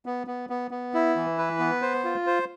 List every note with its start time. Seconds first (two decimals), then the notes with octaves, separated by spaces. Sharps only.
0.06 B3
0.27 B3
0.50 B3
0.71 B3
0.94 E4
1.16 E3
1.38 B4
1.60 B3
1.82 C5
2.04 F4
2.27 C5